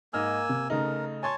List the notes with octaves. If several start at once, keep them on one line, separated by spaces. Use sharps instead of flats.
G#2 A#3 D#5 G#5 E6 F6
C3
C#3 A3 D#4 A#4
C#5 G#5 A5 C6 G#6